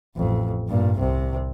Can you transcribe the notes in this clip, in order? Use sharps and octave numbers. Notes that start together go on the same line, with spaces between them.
A1 F2
G2 A#2
C2 C3